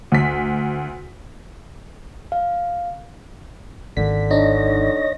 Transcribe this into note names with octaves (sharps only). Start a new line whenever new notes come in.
D2 B6
F5
G#1 G#2 D3 D#3 B6
D4 D#4 C#5 D#5 A#6